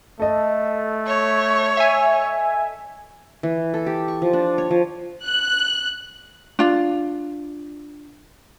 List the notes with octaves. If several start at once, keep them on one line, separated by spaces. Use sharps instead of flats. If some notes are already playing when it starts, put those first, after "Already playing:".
A3 A4 D#5
C#5
E5 G#5
E3
A4
G4
C#6
F3
D4
C#5
F3
F#6
D4 F4